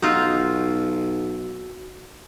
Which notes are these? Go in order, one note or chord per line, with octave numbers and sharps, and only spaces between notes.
B1 D#4 F4 F#4 E6